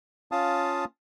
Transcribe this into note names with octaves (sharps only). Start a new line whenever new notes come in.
C#4 F4 F5 A5 D#6